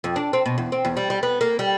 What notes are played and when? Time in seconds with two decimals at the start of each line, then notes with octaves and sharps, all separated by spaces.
0.04 F2
0.16 D4
0.33 C4
0.46 B2
0.58 E2
0.72 C4
0.85 E2
0.97 G3
1.10 G3
1.23 B3
1.41 A#3
1.59 G3